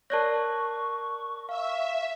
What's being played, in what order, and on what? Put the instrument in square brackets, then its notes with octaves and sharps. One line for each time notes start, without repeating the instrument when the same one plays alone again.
[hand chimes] A#4 F#6 A#6 [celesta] C#5 D5 A5 [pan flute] C#6
[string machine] E5 [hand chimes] F5